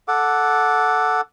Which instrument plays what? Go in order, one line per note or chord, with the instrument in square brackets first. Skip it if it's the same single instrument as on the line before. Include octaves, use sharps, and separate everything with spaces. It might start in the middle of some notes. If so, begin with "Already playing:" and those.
[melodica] A4 F#5 D6